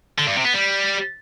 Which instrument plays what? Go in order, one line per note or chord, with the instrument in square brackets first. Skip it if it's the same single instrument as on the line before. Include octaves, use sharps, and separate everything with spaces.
[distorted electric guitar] D3
G2
C3
B3
G3